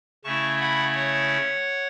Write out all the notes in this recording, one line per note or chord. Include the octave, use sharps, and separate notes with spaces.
C#3 A3 C#4 E4 A5 C#6
F#5 B5
C#5 F#5